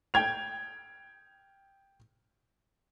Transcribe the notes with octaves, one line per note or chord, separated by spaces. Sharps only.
G5 G#6 F7